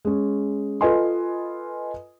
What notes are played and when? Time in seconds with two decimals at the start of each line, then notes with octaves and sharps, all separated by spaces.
0.05 G#3 C#4
0.81 F4 A4 B4 D#5 G#5 C6